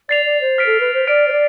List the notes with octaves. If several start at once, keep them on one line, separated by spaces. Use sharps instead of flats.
D5 A6 C7 F7
D5
C5
F6 B6 D7
A4
B4
C5
D5 F6 B6 D7
C5
D5